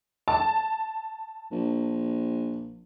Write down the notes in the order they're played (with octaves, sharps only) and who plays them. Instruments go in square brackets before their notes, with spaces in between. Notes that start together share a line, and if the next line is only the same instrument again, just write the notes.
[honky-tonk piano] A5
[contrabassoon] A#1